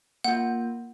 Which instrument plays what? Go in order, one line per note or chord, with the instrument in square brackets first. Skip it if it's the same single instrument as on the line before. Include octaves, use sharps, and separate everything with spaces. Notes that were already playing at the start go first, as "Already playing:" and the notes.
[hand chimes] A#3 F4 [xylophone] F#5